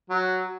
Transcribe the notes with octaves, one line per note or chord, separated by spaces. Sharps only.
F#3